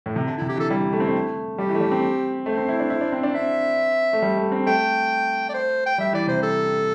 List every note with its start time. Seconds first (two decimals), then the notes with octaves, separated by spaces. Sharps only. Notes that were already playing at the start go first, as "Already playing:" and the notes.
0.06 A2
0.16 C3
0.27 D3 D4
0.38 C3 E4
0.49 G4
0.56 E3 A4
0.70 G3 E4
0.92 A3
1.00 C4
1.08 A3
1.58 G3 G4
1.69 E3
1.75 A3
1.81 G3
1.92 C4
2.46 A3 C5
2.58 C4
2.69 E4
2.80 D4
2.90 E4
3.01 D4
3.12 C4
3.23 D4
3.34 C4 E5
4.13 A3
4.22 G3
4.37 A3
4.52 C4
4.66 A3 G5
5.49 D5
5.54 C5
5.86 G5
5.98 G3 E5
6.13 E3 D5
6.27 C3 C5
6.43 A4